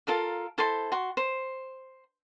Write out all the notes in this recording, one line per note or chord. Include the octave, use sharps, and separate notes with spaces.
F4 A4 A#4 F5
E4 A4 C5 C6
F#4 C6
C5